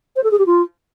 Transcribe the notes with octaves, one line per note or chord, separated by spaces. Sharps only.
C5
A4
G#4
G4
F4